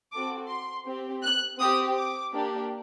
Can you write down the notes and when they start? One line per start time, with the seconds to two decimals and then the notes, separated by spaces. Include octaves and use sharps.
0.12 C4 F#4 A4 D6
0.49 C6
0.86 C4 G4
1.23 F#6
1.59 C4 G4 D#6
1.96 D6
2.33 A#3 D4 G4